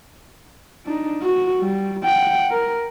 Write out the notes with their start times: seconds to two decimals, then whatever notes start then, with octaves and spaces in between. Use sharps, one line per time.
0.86 D4 D#4
1.23 F#4
1.60 G3
2.04 F#5 G5
2.51 A#4